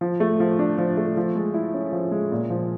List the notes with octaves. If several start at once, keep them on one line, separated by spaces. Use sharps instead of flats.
F3
A3
F3
D4
F3
A3
F3
G#3
E4
C#4
F3
G#3
A#2
F3